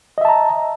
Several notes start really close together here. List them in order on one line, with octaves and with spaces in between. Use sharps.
D#5 E5 A5 A#5